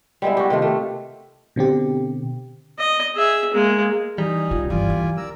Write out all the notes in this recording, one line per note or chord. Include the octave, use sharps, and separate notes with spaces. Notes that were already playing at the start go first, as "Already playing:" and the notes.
G3 G#3 B3 E4
F#4 G4
C3 D#3 A3 F4
A3
B2 D3 C4 G4
D#5
G#4 E5
G#3 A#3
E3 G3 D#4 G#5 A#5
C#3 F4
G1 E3 F4 D5 G#5
C4
A#4 D5 E6